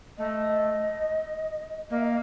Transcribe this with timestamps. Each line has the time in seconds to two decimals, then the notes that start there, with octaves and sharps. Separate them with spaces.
0.18 A3 D#5
1.90 A#3 D#5
1.97 E5
2.04 D#5